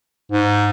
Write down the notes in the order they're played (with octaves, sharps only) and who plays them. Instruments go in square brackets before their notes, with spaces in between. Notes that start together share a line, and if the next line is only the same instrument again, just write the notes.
[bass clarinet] G#2